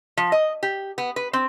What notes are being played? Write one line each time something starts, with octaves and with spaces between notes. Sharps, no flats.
F3
D#5
G4
B3
B4
C4